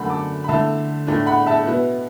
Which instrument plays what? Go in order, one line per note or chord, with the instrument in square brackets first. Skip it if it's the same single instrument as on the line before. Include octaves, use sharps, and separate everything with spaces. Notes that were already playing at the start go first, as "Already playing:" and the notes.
Already playing: [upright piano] F#2 D3 A3 F#5 B5
A5 D6
B5
D3 A3 E4 E5 A5
A2 A3 D4
F#5 B5
E5 A5
B2 B3 E4